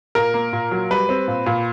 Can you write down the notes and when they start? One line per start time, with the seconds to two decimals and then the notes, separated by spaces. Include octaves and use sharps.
0.15 A#2 A#4
0.34 A#3
0.53 A#2
0.71 F#3
0.91 G3 B4
1.09 C4
1.28 A#2
1.46 A#2